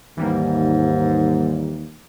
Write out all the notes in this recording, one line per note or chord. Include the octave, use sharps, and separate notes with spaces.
D#2 G#2 E3 G3 A#3